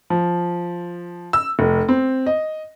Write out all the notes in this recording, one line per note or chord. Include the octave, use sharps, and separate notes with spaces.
F3
E6
F1
C4
D#5